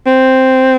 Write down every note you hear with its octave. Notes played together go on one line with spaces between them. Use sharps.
C4